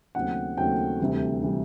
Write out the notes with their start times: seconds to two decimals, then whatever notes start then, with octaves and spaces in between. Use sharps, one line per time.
0.15 D#2 C#3 F#3 A3 C4 F#5
0.57 D#2 C#3 F#3 A3 C4 G5
1.00 D2 C3 E3 G3
1.43 C3 E3 G3